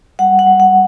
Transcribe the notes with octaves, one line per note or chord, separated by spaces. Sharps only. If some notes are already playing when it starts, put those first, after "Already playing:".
G3 F#5
F#5
G3
F#5